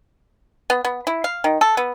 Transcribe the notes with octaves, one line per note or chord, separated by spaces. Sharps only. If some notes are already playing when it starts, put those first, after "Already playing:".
B3
B3
E4
F5
D#3
A4
B3